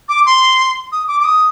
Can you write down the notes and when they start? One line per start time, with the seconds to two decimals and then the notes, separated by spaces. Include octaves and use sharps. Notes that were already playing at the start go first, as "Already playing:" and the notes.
0.09 D6
0.26 C6
0.92 D#6
1.08 D6
1.21 D6
1.25 D#6